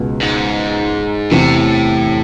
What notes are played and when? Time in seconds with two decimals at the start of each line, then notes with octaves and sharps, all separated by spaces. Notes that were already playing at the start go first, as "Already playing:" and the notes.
Already playing: C#2 B2 G#3
0.21 G#2
1.31 E2 A2 C3 E3